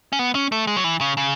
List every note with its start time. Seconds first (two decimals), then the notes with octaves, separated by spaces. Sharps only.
0.13 C#4
0.19 B3
0.35 C#4
0.52 A3
0.67 G#3
0.77 F#3
0.84 E3
1.01 C#3
1.17 C#3